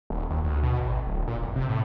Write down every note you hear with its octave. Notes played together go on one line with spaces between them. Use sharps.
D#1
D#2
D2
B2
A1
D1
A#2
F1
C3
A2